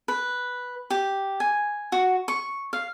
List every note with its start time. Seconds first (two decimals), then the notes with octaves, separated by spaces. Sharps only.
0.08 B4
0.90 G4
1.40 G#5
1.92 F#4
2.28 C#6
2.73 F5